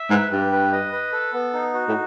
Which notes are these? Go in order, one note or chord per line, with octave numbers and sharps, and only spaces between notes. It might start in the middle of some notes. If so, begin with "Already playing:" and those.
Already playing: E5
G#2 B4
G2 G4
B4
D#5
B4
A4
B3
D#4
F#4
A2